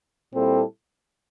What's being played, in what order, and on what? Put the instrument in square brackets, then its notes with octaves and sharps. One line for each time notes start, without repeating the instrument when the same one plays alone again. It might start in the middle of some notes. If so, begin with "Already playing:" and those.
[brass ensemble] A#2 G3 C4 E4 A4